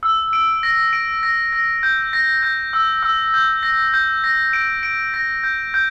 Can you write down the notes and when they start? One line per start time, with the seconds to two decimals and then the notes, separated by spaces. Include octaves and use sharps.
0.03 E6
0.33 D7
0.63 A#6
0.93 D7
1.23 A#6
1.53 A#6
1.83 G6
2.13 A#6
2.43 G6
2.73 E6
3.03 E6
3.34 G6
3.63 A#6
3.94 G6
4.24 A#6
4.53 D7
4.83 D7
5.14 A#6
5.43 G6
5.74 G6